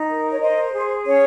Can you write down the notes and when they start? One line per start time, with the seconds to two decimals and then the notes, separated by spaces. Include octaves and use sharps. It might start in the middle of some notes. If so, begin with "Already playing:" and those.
Already playing: D#4
0.10 A#4
0.31 C#5
0.41 C5 D#5
0.72 G#4
1.04 C#4 C#5